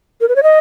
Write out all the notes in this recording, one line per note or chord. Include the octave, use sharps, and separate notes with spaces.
A#4
B4
C#5
D#5